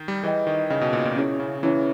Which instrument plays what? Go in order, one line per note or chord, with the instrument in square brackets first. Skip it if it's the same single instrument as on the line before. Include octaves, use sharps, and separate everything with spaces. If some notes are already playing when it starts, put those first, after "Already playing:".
Already playing: [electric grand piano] D#3
G3
[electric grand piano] E3 [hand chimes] G#4 D#5 G5
[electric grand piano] D#3
[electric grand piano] C#3 [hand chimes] G#4 D#5 G5
[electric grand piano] B2
A#2
A#2
[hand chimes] C#4 E4 G#4 C#5
[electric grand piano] C#3
[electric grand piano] E3 [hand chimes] C#4 E4 G#4 C#5